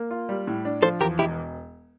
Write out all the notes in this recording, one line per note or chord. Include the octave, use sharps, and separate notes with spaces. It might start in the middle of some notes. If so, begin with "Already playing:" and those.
Already playing: A#3
F4
G3
A2
D4
F3 A4 C5
E2 G4 A#4
E1 E4 G4